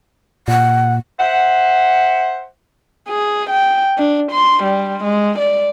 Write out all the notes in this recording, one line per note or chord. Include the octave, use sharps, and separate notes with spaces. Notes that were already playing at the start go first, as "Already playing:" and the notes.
A#2 F#5
C5 E5 F#5
G#4
G5
D4
C6
G3
G#3
D5